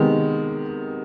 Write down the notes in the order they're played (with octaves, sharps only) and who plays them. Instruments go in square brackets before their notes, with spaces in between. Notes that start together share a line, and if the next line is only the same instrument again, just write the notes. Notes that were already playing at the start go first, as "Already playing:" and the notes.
Already playing: [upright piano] C3 D#3 G#3 B3